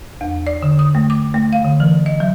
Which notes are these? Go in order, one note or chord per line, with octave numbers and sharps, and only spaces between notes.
E2
D5
D3
D#6
A3
D6
A3
F5
D3
E3
D#5
F#3